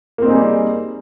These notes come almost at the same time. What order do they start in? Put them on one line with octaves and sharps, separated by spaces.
A#3 C4 D#4 G#4 G3